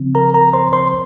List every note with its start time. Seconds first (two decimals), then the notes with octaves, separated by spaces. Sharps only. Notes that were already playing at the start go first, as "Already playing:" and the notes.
Already playing: C#3 F3 C4
0.15 A#4 A#5
0.34 A#4 A#5
0.53 C5 C6
0.73 C5 C6